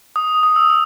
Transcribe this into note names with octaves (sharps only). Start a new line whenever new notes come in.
D#6
D#6
E6
E6